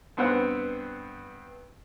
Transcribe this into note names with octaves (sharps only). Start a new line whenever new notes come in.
G2 B3 C4 F#5